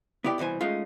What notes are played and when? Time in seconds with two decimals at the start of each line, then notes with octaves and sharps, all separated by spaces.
0.24 B3 E4 G4 D5 G5
0.38 C2 B2 E3 C5 G#5
0.61 G#3 A3 C#4 D#4 F4